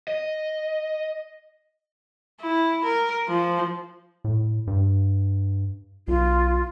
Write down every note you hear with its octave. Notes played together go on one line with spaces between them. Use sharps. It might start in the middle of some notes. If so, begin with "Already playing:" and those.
D#5
E4
A#4
F3
A2
G2
B1 F4